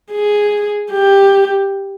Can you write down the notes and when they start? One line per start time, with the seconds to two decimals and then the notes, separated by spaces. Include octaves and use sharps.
0.12 G#4
0.92 G4